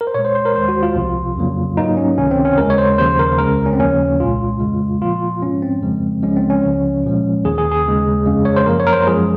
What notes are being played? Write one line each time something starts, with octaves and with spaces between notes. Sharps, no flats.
A#4
C5
A#2 G#3 C#5
C5
C5
A#4
D#2 D#3 G#3 C5
F#4
F4
C2 C3 F3
F2 C#3 F#3 A#3
G#2 F#3 A#3 D#4
C#4
C#2 C3 D#3 C#4
C4
C#4
D#2 C#3 G#3 A#4
C#5
C5
D#2 C#3 F3 C5
A#4
C#2 C#3 G#3 A#4
C#4
C4
D#2 C#3 F3 A#3 C#4
C2 A#2 G#3 F4
F2 C#3 G#3
A#2 F3 A#3 F4
G#2 F3 G#3 C#4
C4
F2 C#3 F3 G#3
C#2 C#3 F3 G#3 C#4
C4
C#4
C#2 C#3 F3
A#2 F3 G#3
D#2 D#3 A#3 G#4
G#4
G#4
D#2 C#3 G#3
F2 C#3 G#3
C#5
C5
F#2 F3 A#3 A#4
C#5
A#4
C5
F#2 F3 G#3 G#4